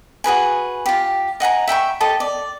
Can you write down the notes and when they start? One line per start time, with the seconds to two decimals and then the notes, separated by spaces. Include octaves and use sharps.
0.24 F#4 G#4 B4 G#5
0.86 F4 G4
1.40 D#5 F#5 G#5 A#5
1.68 E5 G5 B5 C#6
2.00 G4 A4 D#5 A5
2.20 D5